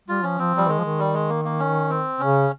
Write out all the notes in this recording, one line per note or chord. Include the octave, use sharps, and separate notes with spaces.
G3 F4
F3 C#4
F3 C4
F3 G3
D#3 G#3
F3
D#3
G3
G#3
A#3
A#3
C#4
C4
C#3 C#4